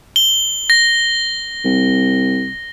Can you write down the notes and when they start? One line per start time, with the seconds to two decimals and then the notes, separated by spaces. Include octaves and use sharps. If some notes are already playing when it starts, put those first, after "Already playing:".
0.16 G7
0.70 A#6
1.65 C2